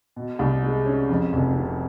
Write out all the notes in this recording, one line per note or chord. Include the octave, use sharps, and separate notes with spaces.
B2
C2
G#3
C#4
F2
F1
C3